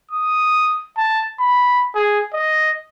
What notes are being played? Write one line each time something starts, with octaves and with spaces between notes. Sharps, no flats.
D#6
A5
B5
G#4
D#5